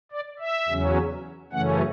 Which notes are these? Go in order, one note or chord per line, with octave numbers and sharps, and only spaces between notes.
D5
E5
E2 C#3 F#3 C#4
F#2 C#3 E3 A3 C#4 F#5